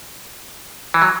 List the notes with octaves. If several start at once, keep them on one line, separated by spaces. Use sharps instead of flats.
E3
F#3